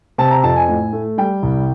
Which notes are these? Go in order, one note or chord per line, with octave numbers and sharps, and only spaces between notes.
C3 A5
A#5
F2 A5
G#5
A2
A3
G3 G5
C2